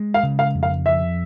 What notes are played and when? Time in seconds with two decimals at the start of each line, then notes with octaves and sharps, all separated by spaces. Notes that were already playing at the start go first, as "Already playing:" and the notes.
Already playing: G#3
0.14 F5
0.23 C#3
0.39 F5
0.55 F2
0.63 F5
0.86 F3 E5